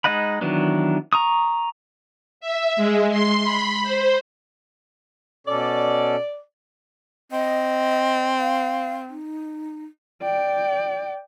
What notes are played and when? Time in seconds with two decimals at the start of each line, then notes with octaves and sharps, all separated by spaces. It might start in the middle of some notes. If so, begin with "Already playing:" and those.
0.04 G#3 D#4 D#5 F#5 B5
0.41 D#3 E3 F#3 B3 D4
1.13 A#5 C#6 D#6
2.41 E5
2.76 G#3
3.11 C6
3.43 B5
3.83 C5
5.47 B2 C#4 A4 D5
7.32 C4 D#5
8.39 F5
9.09 D#4
10.23 D5 G5